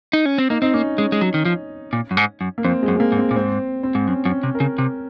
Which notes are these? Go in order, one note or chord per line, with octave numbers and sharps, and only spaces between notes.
D#4
C#4
C4
A#3 D#4
C4 D#4
A#3 C#4
G#3 C#4
G#3
F#3
D#3
F3
A#2
F#2
G#2
F#2
A#3
F2 C4
G#3
F#2
G#3
A#3
G#2
C4
A#2
G#2 C4
C4
G#2
F#2 C#4
F#2
C#4
C3
A#4
C#3
C3